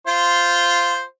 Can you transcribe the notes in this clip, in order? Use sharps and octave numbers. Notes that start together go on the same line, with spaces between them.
F4 C5